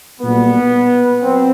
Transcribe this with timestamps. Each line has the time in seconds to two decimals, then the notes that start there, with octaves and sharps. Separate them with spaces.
0.20 B1 A#2 G3 B3
1.22 F#3 C4